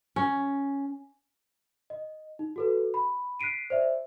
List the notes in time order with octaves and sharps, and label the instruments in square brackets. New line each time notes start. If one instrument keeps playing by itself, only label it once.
[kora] C#4
[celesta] D#5
D#4
F#4 A4 B4
B5
F#6 B6 C7 D7 D#7
C5 D5 E5